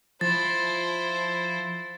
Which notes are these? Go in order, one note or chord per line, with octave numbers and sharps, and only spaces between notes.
F3 E4 C5 A6